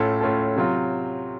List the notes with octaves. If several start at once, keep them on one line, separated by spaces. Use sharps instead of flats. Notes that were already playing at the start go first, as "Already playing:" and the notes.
Already playing: A2 A3 C#4 F4 A4
A2 A3 C#4 F4 A4
C3 F#3 C4 F4